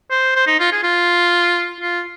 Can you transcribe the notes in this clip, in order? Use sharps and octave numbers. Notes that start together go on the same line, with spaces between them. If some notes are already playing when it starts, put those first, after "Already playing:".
C5
C5
D#4
F4
G#4
F4
F4